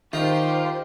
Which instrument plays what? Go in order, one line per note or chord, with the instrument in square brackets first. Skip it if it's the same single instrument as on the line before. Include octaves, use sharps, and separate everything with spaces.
[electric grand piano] D#3 [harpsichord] D#4 [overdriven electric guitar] F4 [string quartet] G4 C5